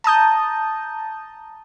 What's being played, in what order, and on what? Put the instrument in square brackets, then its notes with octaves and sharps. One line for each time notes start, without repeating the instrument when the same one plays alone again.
[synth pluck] A5 A#5 D#6 G6